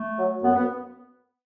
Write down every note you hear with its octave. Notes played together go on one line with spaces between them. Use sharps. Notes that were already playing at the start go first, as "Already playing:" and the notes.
Already playing: A3
F#3
F#2 B3
B3